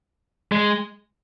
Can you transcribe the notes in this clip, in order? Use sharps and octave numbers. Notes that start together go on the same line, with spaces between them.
G#3